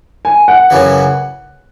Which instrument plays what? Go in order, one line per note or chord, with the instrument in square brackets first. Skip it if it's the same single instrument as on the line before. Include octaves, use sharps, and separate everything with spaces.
[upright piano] G#5
F#5
[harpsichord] F#2 C#3 E3